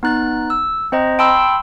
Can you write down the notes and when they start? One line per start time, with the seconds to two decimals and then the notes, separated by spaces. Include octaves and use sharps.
0.03 B3 D#4 F#6 A6
0.50 E6
0.92 C4 C5 D#5 A#5
1.19 G5 A5 B5 C6 E6